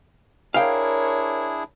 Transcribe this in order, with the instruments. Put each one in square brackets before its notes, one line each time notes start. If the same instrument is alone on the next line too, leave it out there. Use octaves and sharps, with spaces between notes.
[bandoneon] D4 E4 G#4 [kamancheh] A#4 C#5 [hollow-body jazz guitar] F5 G5